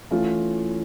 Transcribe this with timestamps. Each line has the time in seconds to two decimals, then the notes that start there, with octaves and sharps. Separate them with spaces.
0.11 E3 A3 C#4 F4